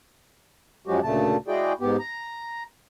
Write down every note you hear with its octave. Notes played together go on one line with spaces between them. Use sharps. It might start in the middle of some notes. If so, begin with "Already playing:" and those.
F#2 F3 F#3 G#3 F#4 G4
D2 A#2 C#3 A3 A5
G#3 E4 F#4 G#4 D5 G5
G#2 B3 G4
A#5